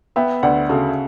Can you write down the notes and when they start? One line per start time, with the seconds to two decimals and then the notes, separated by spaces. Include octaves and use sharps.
0.16 B3 E5 G5
0.43 D2 D5 F#5
0.69 C#3 F#4 A4